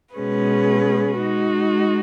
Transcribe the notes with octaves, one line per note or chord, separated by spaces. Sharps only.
B2 G#3 C#4 G#4 B4
G#3 D#4 F#4